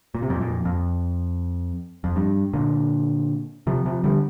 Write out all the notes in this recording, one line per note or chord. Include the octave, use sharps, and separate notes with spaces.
A#2
C3
F2 A#2
F2 A#2
F2
F2
G2
A#2 D3
C3 F3
C3 F3
D3 G3